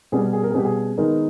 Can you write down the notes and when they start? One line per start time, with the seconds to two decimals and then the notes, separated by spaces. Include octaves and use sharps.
0.12 B2 G3 C#4 G#4
0.33 G#4
0.43 A#4
0.51 G#4
0.54 B2 G3 C#4 G4
0.65 G#4
0.97 D#3 G#3 B3 D#4 A#4